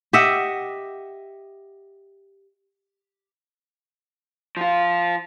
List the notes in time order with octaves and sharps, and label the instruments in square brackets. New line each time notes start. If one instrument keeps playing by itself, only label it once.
[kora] G4 D#5 E5 F#5
[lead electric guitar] F3 F4